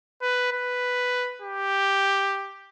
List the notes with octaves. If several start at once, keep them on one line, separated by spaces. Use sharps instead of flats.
B4
B4
G4